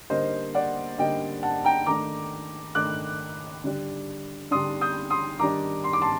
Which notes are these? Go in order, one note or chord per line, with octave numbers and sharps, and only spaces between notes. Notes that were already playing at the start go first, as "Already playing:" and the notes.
D3 G3 A#3 D#4 C5 D#5
D5 F#5
D3 G3 A#3 D#4 D#5 G5
F#5 A5
G5 A#5
D#3 A3 D4 A#5 D6
D#3 A3 D4 D6 F#6
D3 G3 D4
D3 G3 D4 C6 D#6
D#6 G6
C6 D#6
D#3 G3 D4 A#5 D6
C6
D6
A5 C6